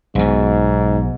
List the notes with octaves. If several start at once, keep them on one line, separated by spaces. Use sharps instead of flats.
B1 G#2 B2